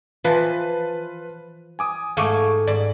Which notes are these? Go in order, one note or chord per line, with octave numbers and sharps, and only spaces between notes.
E3 F3 F4 B4 A5
G#5 D6 D#6
G#2 A3 F5 G#5 C#6 D6
G#2 D5